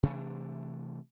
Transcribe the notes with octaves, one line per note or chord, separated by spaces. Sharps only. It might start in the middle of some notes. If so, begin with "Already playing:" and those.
C3 E3 A3 D4